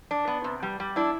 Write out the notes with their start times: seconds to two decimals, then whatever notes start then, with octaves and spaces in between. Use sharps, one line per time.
0.11 D4
0.27 B3
0.44 C3
0.63 G3
0.80 G3
0.96 D4 E4